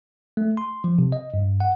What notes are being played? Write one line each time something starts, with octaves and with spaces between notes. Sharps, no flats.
A3
C6
F3
C3
D#5
G2
F#5